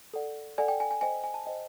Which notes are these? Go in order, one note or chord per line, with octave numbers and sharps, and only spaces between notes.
A4 D5 F#5
A4 D5 F#5 G#5
G5
G#5
G#5
C5 D#5 G5 G#5
G#5
A5
C5 D#5 G5